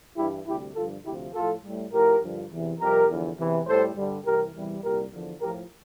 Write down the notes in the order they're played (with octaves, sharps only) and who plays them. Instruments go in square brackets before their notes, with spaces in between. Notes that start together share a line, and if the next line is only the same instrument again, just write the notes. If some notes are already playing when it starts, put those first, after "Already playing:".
[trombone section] G2 E3 G3 E4 G4
D2 C3 G3 E4 G4
G2 D3 F3 F4 A4
D2 C3 F3 E4 G4
A2 F3 F4 A4
A2 G3
A2 F3 G4 A#4
G2 D3 F3
E2 C3 E3
F2 C3 G3 G4 A#4
E2 D3 F3
E2 C3 E3
A2 G3 A4 C5
G2 D3 G3
C2 C3 E3 G4 A#4
E2 C3 E3 G3
C2 A#2 G3 G4 A#4
E2 D3 F3
A2 G4 A#4
F3